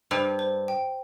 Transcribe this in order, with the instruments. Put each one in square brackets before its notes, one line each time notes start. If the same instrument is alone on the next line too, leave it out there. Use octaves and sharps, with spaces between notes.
[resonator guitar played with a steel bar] G2 [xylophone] C5
[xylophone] C5
G5